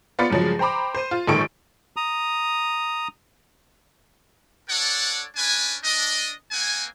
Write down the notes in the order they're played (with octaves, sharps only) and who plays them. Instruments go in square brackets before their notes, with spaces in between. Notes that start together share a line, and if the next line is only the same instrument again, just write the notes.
[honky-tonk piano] B3 F4 D5 B5 A6 C#7
G2 C#3 F3 F#3 G#3
C5 G5 A#5 B5 D6
C5 D#7
F4
A#1 G#2 D#3 A4 C#6 D7
[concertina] A#5 D#6
[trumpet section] D4 A4 C#5 D5 F#5
C#4 D4 B4 G#5
D4 D#5
A#3 C4 F#5 G#5